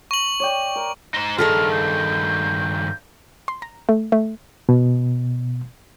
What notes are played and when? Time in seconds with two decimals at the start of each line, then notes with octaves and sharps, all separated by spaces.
0.11 C#6 F#7
0.40 C#5 D5 G5
0.75 A#4
1.14 D#4 C5
1.38 G2 D#3 G#4 A4 D#5 F6
1.72 G6
3.48 C6
3.62 A#5
3.89 A3
4.12 A3
4.69 B2